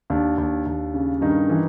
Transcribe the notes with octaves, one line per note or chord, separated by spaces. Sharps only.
D#2 D4
D#2
D#2
C#3
G2 D#3 D#4
E3